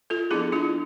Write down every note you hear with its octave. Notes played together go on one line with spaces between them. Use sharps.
F4 A4
F3 B3 D4 E4 G#4
D4 F4